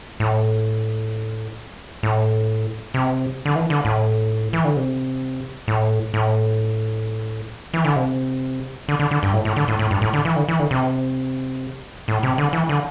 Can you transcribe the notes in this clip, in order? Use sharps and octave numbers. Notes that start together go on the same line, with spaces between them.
A2
A2
C3
D3
E3
D3
A2
E3
D3
C3
A2
A2
E3
D3
C3
D3
D3
D3
G2
A2
A2
D3
A2
A2
G2
A2
D3
E3
D3
E3
D3
C3
A2
C3
D3
E3
D3